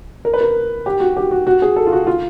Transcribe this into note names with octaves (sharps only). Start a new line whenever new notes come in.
A#4
B4
A#4
G4
F#4
G4
F#4
F#4
G#4
A4
F4
F#4
F4